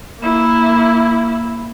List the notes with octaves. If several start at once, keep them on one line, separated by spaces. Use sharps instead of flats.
A#3 E4